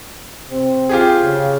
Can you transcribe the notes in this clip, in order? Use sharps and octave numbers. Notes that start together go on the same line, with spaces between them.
C3 C4
F4 G4 G#4
C#3